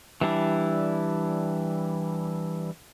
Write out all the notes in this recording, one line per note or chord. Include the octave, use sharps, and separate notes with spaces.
E3 G3 D4 E4